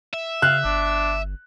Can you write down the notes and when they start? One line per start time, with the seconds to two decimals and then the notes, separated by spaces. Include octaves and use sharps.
0.14 E5
0.42 C#3 F5 F#6
0.64 G1 D4